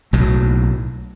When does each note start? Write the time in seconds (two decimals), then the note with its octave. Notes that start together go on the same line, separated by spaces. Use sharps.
0.13 B1 A2 F#3